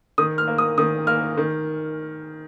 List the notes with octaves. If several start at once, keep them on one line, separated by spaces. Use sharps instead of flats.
D#3 D#6
F6
A#3
D#6
D#3 D#6
A#3 F6
D#3